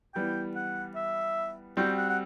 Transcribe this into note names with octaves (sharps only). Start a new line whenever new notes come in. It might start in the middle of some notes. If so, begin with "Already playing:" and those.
E3 G3 B3 G5
F#5
E5
G3 C4 F#4 G5
F#5
F#5